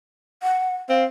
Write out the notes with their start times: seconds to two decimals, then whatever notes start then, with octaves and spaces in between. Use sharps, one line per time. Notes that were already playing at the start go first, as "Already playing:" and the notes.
0.43 F#5
0.89 C4 F5